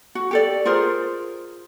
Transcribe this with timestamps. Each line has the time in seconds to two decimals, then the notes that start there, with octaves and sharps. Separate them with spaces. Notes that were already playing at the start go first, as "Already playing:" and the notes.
0.15 F#4
0.31 G4 A4 D5
0.65 F4 G#4 A#4 C5